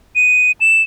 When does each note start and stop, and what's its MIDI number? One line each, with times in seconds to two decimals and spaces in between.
0.16 0.52 99
0.61 0.82 100